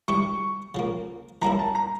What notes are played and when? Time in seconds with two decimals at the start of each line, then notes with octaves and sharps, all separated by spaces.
0.08 E3 G3 D4 G4 C#6
0.75 C#3 F3 A#3
1.42 E3 G3 A#3 C#4 E4 A#5
1.59 A5
1.75 A#5